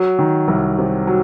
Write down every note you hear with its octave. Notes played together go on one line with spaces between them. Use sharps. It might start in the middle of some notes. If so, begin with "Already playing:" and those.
Already playing: F#3
D#3
C2
C3
F#3